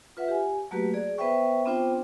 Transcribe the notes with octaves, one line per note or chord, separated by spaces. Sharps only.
F4 B4 E5 F#5
G4 G#5
F#3 A3 A#3 F#4 G4 B4
G#4 D5
B3 B4 C5 E5 G5 C#6
B3 C4 D4 F4 C5 G5